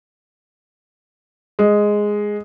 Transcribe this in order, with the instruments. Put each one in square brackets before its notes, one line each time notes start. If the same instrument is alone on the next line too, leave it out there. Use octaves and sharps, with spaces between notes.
[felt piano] G#3